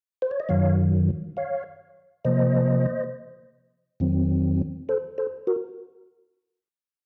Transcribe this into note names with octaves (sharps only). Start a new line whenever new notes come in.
C5
C#5
D#5
F#2 D#3 F#3 C#5 F5
C#5 F5
C3 F3 A#3 C5 D#5
F2 D#3 F#3 C4
A4 C5
A4 C5
F#4 A#4